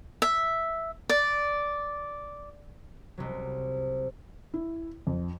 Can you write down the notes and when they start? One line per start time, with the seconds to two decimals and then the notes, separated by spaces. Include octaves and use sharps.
0.22 E5
1.09 D5
3.18 C2 C3 F#3
4.54 E4
5.07 F2